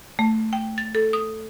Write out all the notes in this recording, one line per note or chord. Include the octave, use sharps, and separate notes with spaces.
A3
G5
A6
A4
D#6